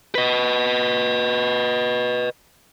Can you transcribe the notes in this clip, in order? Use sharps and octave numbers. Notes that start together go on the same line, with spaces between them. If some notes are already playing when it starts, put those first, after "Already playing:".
B4 D#5